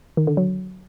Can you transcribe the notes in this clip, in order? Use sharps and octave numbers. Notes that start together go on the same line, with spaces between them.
D#3
D3
F#3